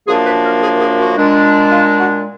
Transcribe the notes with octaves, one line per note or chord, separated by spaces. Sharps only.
F#2 F3 A#3 D4 G#4
B4
A#4
G#4
G#4
F#4
A#2 G#3 D4
F4
F#4